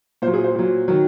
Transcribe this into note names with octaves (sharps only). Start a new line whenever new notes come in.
A#2 C5
F#3
G#4
C5
A#2 F#3
D#3 F#3